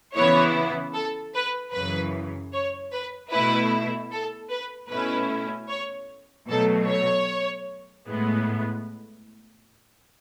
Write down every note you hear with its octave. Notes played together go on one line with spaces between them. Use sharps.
C#3 E3 B3 E4 C#5
A4
B4
F#2 C#3 E3 B4
C#5
B4
B2 A3 E4 B4
A4
B4
B2 A3 C#4 E4 B4
C#5
B2 F#3 A3 A4
C#5
A2 G#3 B3